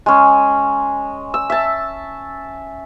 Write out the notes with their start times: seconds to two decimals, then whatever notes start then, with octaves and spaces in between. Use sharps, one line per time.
0.06 G#3 C#4
1.34 E6
1.50 E5 A5